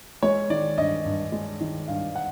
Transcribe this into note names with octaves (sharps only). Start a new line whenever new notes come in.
G#3 C#5
D#3 D5
G2 D#5
G2
G#3
D#3
G2 F5
F#5